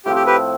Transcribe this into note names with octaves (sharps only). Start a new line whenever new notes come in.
A2 F3 C4 G4
G4
G4 B4